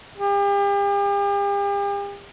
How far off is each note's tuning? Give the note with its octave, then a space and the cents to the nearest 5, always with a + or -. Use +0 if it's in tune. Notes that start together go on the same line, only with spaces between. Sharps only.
G4 +40